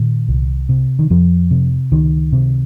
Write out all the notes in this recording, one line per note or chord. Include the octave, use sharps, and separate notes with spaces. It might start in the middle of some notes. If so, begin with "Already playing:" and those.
Already playing: A#2 D#3
C2
C3
D#3
F2 F3
C3
C#2 D#3
C3